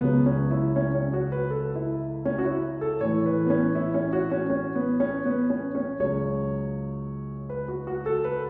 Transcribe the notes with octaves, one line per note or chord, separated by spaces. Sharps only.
C#2 C#3 F#3 B3
C#4
E4
C#4
C#4
F#4
B4
A4
E4
C#4
F#4
E4
A4
A2 E3 C#5
B4
B3
C#4
E4
C#4
F#4
C#4
C#4
B3
C#4
B3
C#4
C#4
C#2 C#3 F#3 C#5
B4
F#4
F#4
A4
B4